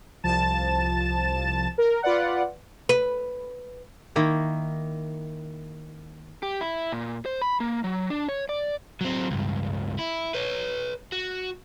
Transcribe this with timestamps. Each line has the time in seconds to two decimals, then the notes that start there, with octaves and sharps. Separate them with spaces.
0.24 C2 F3 A5 A6 E7
1.78 A#4
2.02 F4 B4 D5 F#5
2.89 B4
4.16 D#3 A#3 E4
6.43 G4
6.61 E4
6.92 A#2
7.26 C5
7.42 B5
7.60 A#3
7.84 F#3
8.10 D4
8.29 C#5
8.49 D5
9.01 F#3 C4
9.31 C#2 G2
9.99 E4
10.34 B4 C#5
11.12 F#4